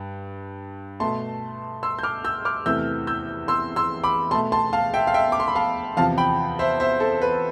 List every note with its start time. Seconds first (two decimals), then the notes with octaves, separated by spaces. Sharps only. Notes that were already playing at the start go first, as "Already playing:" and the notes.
Already playing: G2
1.00 B2 A3 A5 C6
1.83 C6 E6
1.99 G6
2.03 D6 F6
2.24 E6 G6
2.45 D6 F6
2.66 E2 C3 E3 A3 E6 G6
3.07 E6 G6
3.48 C6 E6
3.76 C6 E6
4.04 B5 D6
4.31 B2 A5 C6
4.35 A3
4.52 A5 C6
4.73 F5 A5
4.94 E5 G5
5.07 F5
5.14 E5 G5
5.32 D6
5.40 C6
5.48 B5
5.55 F5 A5
5.97 E2 C3 F3 F5 A5
6.18 G5 B5
6.59 C5 E5
6.80 C5 E5
7.00 A4 C5
7.22 B4